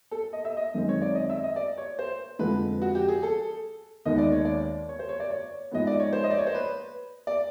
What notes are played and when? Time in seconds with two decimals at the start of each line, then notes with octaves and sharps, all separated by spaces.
0.11 A4
0.33 D#5
0.45 E5
0.57 D#5
0.74 F#2 D#3 G#3 C4
0.89 C#5
1.02 D5
1.15 D#5
1.30 E5
1.43 D#5
1.56 D5
1.78 C#5
1.99 C5
2.39 F2 D3 F3 G#3 B4
2.82 F#4
2.95 G4
3.08 G#4
3.23 A4
4.05 D#2 D#3 G#3 B3 D#5
4.18 D5
4.32 C#5
4.45 D5
4.89 C#5
4.99 C5
5.09 C#5
5.20 D5
5.30 C#5
5.71 G#2 F3 G#3 B3 D#5
5.87 D5
6.00 C#5
6.13 C5
6.24 D#5
6.31 D5
6.38 C#5
6.47 C5
6.54 B4
7.27 D5